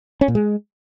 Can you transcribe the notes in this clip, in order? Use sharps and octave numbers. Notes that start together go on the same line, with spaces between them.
C#4
A#2
G#3